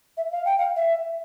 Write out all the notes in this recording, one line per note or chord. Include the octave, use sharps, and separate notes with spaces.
E5
F5
G5
F5
E5